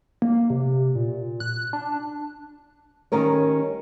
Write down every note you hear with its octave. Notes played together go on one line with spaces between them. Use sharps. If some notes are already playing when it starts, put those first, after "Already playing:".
A#3
C3
A#2
F#6
D4
D#3 G3 C#4 A#4 C#5